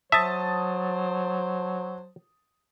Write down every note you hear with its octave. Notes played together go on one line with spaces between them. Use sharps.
F#3 C5 E5 A5 D#6 A6